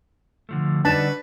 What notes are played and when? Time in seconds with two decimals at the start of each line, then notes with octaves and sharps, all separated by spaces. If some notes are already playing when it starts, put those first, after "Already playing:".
0.49 D3 F3 A3
0.85 D3 G3 D4 D#4 F#4 B4 A5